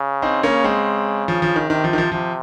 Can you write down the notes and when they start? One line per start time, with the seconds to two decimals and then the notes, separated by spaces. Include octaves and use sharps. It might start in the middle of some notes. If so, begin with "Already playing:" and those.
Already playing: C#3
0.22 C4 D#4
0.43 C#3 A#3 C#4
0.64 G#3 C4
1.28 F3
1.42 F3
1.56 D#3
1.70 C3 D#3
1.84 F3
1.93 D#3
1.98 F3
2.12 C3 F3